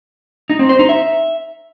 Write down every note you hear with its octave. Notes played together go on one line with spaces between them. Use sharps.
D#4
C4
C5
D#4
E5